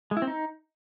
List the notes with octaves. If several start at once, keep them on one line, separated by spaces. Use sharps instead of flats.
G#3
E4
C4
D#4